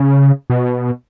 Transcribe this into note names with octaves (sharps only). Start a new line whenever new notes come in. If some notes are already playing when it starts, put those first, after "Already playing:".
Already playing: C#3
B2